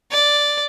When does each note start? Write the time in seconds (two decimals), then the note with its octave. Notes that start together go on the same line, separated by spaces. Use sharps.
0.12 D5